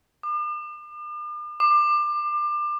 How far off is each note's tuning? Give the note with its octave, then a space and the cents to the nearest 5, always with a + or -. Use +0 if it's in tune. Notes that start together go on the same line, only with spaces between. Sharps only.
D6 +45
D6 +30